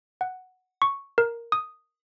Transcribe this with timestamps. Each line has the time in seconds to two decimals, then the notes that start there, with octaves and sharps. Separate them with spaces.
0.21 F#5
0.82 C#6
1.18 A#4
1.52 D#6